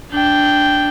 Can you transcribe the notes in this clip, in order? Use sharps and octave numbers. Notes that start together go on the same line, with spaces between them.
D4 G5